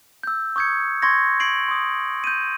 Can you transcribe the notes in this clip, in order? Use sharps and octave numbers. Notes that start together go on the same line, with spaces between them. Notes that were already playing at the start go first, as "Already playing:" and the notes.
E6 G6
C#6 D#6 G6 G#6 C#7
C6 C#6 G#6 A#6 C#7
G#6 C7 D7 F#7
C6 D#6
G6 D#7